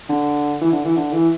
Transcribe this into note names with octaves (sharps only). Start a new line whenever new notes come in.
D3
E3
D3
E3
D3
E3